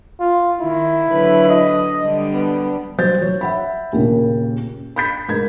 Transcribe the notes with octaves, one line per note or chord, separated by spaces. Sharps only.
F4
D#3 E4
D3 F#3 B4
D#5
D3 G3
B3
F#3 G3 C5 G6 A6
F#3 C#5
E5 F#5 B5
D#2 A#2 C#3
B5 G6 B6
G#2 A#4 G#6